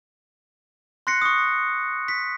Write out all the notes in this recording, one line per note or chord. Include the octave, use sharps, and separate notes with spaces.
C6 F#6 A#6 C7 C#7
C#6 D#6
B6